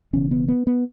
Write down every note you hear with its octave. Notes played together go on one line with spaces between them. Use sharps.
E1 E2 C#3 C#4
B3
B3
B3